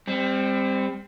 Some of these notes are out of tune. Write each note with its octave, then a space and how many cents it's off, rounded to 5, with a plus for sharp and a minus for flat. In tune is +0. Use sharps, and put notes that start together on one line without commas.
G3 +35 C4 +0